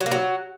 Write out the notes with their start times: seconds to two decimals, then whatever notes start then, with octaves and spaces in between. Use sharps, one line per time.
0.01 F#3
0.06 A#3
0.11 F#3